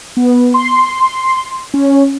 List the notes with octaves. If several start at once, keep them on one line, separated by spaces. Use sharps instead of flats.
B3
C6
C#4